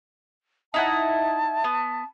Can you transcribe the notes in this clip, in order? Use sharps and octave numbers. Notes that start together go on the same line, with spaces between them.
D#4 E4 F#5 A5
B3